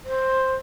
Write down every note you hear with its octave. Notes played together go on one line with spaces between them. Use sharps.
C5